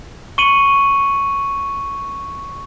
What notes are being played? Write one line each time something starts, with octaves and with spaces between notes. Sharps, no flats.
C#6 C#7 D#7 F#7